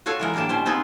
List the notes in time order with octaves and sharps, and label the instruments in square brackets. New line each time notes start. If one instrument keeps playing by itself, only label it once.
[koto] F4 F#4 A4 C#5 F5
E3 G#3 A#4
A2 D3 A#3 G4 A5
B2 C#4 C5
B3 C4 D#4 F4 G#4